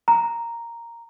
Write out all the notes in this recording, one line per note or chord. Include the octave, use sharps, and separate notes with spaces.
A#5